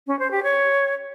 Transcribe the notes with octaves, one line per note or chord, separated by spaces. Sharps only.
C#4
C5
G4
C#5